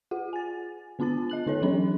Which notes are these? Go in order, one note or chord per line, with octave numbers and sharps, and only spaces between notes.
F4 G#4 F#5
G#5 A6
D3 B3 D4 F4 A5 A6
D#5 F#6 F#7
D3 D#4 A4 C#5
E3 F#3 C#4 D4